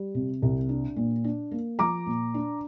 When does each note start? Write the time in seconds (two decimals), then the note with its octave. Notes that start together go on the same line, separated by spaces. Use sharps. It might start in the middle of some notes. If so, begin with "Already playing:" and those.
Already playing: G3
0.15 C3
0.42 C2
0.69 D4
0.96 A#2
1.24 D4
1.51 A#3
1.79 F3 A#5 D6
2.06 A#2
2.34 D4